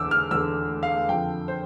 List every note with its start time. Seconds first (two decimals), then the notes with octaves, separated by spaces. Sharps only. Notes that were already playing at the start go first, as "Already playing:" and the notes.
Already playing: E2 D3 D6 E6
0.11 F6
0.31 E2 D3 E6
0.83 F5
1.09 F2 D3 G5
1.48 C5